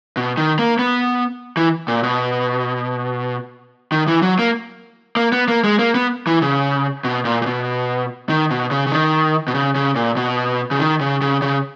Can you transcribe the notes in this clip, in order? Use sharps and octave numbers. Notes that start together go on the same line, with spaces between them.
B2
D#3
A#3
B3
E3
A#2
B2
D#3
E3
F#3
A#3
A#3
B3
A#3
G#3
A#3
B3
E3
C#3
B2
A#2
A#2
B2
D#3
B2
C#3
C#3
D#3
B2
C#3
C#3
A#2
B2
C#3
D#3
C#3
C#3
C#3